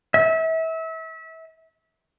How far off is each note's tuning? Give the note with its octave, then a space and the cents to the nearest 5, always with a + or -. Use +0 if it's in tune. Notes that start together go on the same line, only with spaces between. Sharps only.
E5 -30